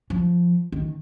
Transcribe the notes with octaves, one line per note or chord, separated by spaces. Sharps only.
F3
D#3